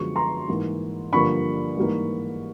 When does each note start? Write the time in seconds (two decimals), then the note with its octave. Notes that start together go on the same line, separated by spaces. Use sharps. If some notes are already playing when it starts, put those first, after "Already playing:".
Already playing: F#2 D3 F3 G#3 B3 C#6
0.16 A#5 C6
0.49 G#2 E3 G3 A#3
1.12 G2 D3 F3 A#3 B5 C#6
1.76 G#2 E3 G3 A#3